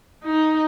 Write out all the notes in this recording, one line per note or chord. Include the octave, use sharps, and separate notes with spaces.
D#4